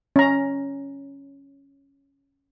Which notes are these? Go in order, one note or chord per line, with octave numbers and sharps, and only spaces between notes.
C#4 A#5